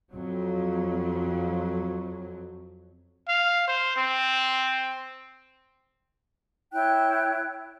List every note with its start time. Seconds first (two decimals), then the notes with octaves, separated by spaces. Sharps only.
0.11 F2 F#3
3.29 F5
3.68 C5
3.97 C4
6.73 E4 C#5 G5 F#6